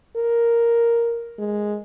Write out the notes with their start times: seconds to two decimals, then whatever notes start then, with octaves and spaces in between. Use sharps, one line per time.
0.16 A#4
1.38 G#3